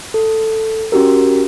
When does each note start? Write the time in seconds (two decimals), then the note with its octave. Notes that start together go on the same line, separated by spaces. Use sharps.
0.14 A4
0.92 C#4 F#4 G4 A#4